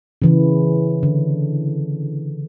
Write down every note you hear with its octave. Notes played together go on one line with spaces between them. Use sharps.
C#3 E3
D3